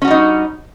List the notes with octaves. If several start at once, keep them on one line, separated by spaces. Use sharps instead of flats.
G3 C#4 D#4 F#4